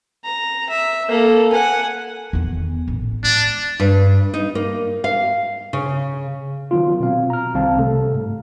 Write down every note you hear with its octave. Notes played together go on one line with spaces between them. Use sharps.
A#5
E5
A#3 A4
F#5 G#5
E2 D#3
A1
G#3 D4
G2
D#4
A#3
F5
C#3
D#3 F#3 B3 F4
B2 C4 F5
A#5 F6
C2 D#3 G3 C4 F5 A5
C3 A3 A4
G#2